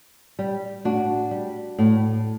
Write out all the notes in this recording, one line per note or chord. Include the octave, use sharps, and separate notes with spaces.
G3
A2 D4 F#4
G3
A2